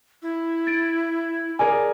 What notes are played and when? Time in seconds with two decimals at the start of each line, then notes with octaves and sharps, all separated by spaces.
0.22 E4
0.67 A6 D7
1.59 G#4 A#4 D5 G#5